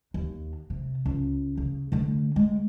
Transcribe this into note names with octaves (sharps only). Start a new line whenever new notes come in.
D#2
C3
C#2
C#3
D3 A3
G#3